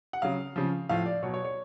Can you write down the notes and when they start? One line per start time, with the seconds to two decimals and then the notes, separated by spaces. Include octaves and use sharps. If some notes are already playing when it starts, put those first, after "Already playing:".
0.13 F#5
0.22 C#3 F#3 F5
0.56 C#3 F3
0.89 A2 F3 F5
1.06 D5
1.23 B2 F#3 C#5
1.34 C#5
1.44 C#5